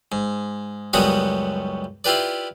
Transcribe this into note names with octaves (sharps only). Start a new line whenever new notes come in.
G#2
C#2 F#2 G3 B3 F#4 D#6
E4 F4 G4 B4 D5